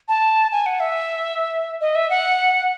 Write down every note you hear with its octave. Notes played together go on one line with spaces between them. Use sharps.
A5
G#5
F#5
E5
D#5
E5
F#5